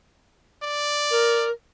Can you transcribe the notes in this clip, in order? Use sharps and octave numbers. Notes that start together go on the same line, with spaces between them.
D5
A#4